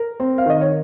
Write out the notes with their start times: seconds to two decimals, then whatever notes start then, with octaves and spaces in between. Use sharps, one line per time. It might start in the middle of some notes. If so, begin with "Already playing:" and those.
Already playing: A#4
0.20 C4
0.38 F5
0.46 D#3 D#5
0.61 C#5